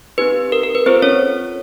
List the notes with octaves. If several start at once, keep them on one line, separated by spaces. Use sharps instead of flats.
C4 D#4 G4 B4
A#4
A#4
B4
C4 F4 A4 C5
C#4 C#5